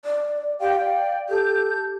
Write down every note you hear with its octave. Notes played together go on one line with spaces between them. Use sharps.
D5
G4 F5 G5
D5 G5
G4 A4 G6